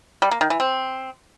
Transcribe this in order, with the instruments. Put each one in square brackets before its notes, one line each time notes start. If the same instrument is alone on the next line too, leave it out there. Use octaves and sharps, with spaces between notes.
[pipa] G3
A#3
D#3
E3
C4